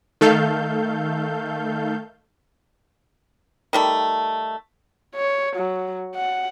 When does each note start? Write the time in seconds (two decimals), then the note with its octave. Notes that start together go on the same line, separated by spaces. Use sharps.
0.21 D#3 A3 A4 F5 G6
3.73 D#3 G3 A3
5.15 C#5
5.56 F#3
6.16 F#5